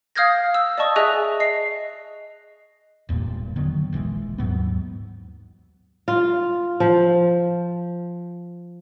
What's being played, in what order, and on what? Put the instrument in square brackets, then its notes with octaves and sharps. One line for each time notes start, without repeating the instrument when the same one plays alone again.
[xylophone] F5 D#6 F6 G6 G#6 A#6
E6
D5 D#5 A5 C#6 D#6
G#4 D#5 E5 G#5 D#6 F#6
D#5 C7
[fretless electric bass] E1 E2 G2 A#2
D3 D#3 F#3 B3
E1 A#1 E3 G#3
D#2 G#2 F#3 B3
[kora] F4
F3